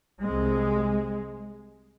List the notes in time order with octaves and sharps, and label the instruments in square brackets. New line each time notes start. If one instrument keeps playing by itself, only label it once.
[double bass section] C2 C3 G#3